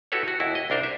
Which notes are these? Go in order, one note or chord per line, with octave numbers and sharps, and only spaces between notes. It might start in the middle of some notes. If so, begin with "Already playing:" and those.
E4 F#4 G4 A4 B4 C#5
F#4
D#2 E4 F#4
D#5
C2 D4 A#4 C5
E5